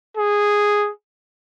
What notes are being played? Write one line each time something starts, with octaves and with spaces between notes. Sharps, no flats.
G#4